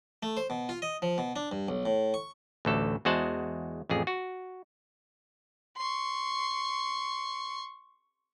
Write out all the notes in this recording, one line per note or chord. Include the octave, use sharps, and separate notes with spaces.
A3
C5
B2
F4
D#5
F3
B2
D4
G2
B1
A2
C#6
A1 D2 A4
E2 G#3 F#4 C5 F#5 A5
A1 F2 G#4
F#4
C6 C#6